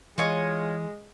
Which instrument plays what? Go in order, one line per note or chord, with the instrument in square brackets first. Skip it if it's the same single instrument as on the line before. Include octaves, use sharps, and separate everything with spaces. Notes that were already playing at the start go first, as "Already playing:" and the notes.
[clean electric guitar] E3 G#5 [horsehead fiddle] G#3 [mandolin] F4 C#5 D#5